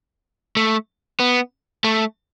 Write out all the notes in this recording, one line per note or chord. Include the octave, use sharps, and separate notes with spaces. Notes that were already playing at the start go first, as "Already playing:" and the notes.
A3
B3
A3